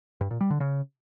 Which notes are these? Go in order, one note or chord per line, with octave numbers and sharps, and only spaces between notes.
G2
A#2
G3
D3
C#3